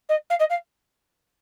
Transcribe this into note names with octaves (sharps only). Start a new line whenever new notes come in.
D#5
F5
D#5
F5